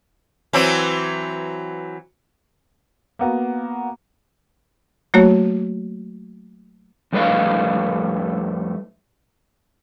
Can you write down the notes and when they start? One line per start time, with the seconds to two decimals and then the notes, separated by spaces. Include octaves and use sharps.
0.53 E3 F#3 C4
3.19 A#3 B3 F#4
5.14 F#3 A3 A#3 F#4 C#5
7.13 F2 G3 A3 B4 D#5 F5